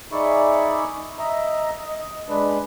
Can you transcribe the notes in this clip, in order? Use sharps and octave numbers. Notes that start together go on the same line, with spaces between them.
D#4 G#4 D5 E5 B5 C#6
D#5 E5 A#5
D#5
G#3 D4 B4